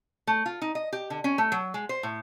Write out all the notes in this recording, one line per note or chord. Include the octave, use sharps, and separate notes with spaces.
A3
F4
D#4
D#5
G4
D3
C#4
A3
F#3
G#3
C5
A2